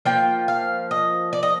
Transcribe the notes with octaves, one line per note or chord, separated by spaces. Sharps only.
F3 A#3 F4 G5
F5
D#5
D5
D#5